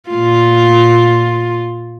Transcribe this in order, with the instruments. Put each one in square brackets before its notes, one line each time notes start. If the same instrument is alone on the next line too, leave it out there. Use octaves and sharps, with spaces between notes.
[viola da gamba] A#2 F4